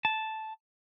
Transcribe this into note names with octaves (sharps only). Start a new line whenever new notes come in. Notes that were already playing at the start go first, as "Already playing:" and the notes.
A5